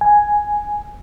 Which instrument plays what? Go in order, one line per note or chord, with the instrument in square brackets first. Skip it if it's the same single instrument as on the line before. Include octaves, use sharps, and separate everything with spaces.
[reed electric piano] G#5